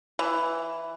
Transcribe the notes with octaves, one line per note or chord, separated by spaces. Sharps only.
E3